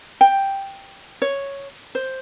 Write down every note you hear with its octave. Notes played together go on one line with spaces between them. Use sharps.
G5
C#5
C5